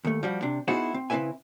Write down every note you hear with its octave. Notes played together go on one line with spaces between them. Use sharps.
D#2 A3
F3 G3 F#4
C3 D4
B3 D#4 E4 F#4 G#4 C5
C4
C#3 C4 E4 B4 E5 G#5